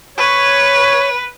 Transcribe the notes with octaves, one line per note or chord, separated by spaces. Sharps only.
B4 C#5